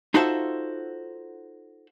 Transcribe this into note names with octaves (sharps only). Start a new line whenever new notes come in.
D#4 F4 F#4 A4 C5 E5